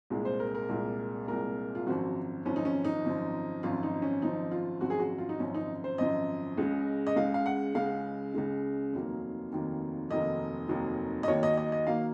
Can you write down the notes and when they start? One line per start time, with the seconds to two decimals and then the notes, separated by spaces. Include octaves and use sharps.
0.10 C2 A#2 G#3
0.25 C5
0.40 A#4
0.55 A#4
0.69 C2 A#2 G#3
1.28 C2 A#2 G#3 A#4
1.75 F4
1.87 G#1 F#2 F3 F#4
2.45 G#1 F#2 F3 C#4
2.56 D#4
2.65 C#4
2.85 D#4
3.04 G#1 F#2 F3
3.63 G#1 F#2 F3 F4
3.83 D#4
4.02 C#4
4.22 G#1 F#2 F3 D#4
4.51 F4
4.81 G#1 F#2 F3 F#4
4.90 G#4
5.00 F#4
5.18 F4
5.29 D#4
5.40 G#1 F#2 F3 C#4
5.54 D#4
5.84 C5
5.98 G#1 F#2 F3 D#5
6.58 C#2 C#3 G#3
7.07 D#5
7.16 C#2 C#3 G#3 F5
7.34 F5
7.46 F#5
7.75 C#2 C#3 G#3 F5
8.34 C#2 C#3 G#3
8.93 F1 D#2 D#3 F#3 A#3
9.51 F1 D#2 D#3 F#3 A#3
10.10 F1 D#2 D#3 F#3 A#3 D#5
10.69 F1 D#2 D#3 F#3 A#3
11.23 D#5
11.28 D#2 D#3 F#3 A#3 C#5
11.43 D#5
11.57 D#5
11.72 D#5
11.87 D#3 F#3 A#3 F5